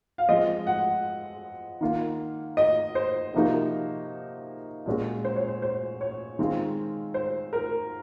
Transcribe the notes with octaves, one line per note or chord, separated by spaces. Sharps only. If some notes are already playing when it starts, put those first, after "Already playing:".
F5
F3 G#3 C4 D#5
F#5
D#3 A#3 F4
D#5
C5
C3 F3 A#3 D#4 F#4
A#2 G#3 C#4 F#4
C5
C#5
C5
C5
C#5
D#3 G#3 C4 F4
C5
A#4